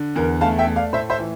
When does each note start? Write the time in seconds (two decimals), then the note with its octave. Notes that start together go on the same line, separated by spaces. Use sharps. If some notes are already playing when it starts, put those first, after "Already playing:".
Already playing: D3
0.16 E2 A#4
0.41 A3 F5 A5
0.58 E5 G5
0.67 A3
0.76 D5 F5
0.93 A2 C5 E5
1.10 C5 E5
1.18 E3